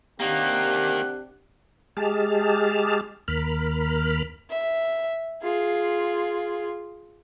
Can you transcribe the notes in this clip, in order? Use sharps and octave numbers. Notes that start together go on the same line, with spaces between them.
C3 D#3 A#3 D4 G4 F#5
G#3 G4 G#4 A5 F6
D#2 A#4 B5 F6
E5
F4 G#4